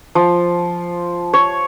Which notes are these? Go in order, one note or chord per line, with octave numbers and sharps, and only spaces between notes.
F3
C#5